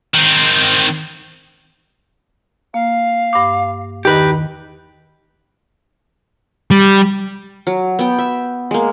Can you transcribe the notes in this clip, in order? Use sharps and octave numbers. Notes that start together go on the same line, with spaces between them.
D#3 C4
A#3 F5
G2 D6
E2 D#3 D#4 G4 B4
G3
F#3
B3 G5
E5
G#3 A#3